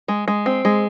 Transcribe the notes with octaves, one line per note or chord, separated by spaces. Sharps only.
G#3
G#3
C4
G#3